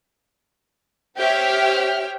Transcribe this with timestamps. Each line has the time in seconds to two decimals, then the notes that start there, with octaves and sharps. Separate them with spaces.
1.19 G4 C5 C#5 E5 G5 F6